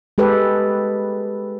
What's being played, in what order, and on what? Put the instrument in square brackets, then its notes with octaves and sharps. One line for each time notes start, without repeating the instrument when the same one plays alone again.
[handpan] G#3 G4 A4 B4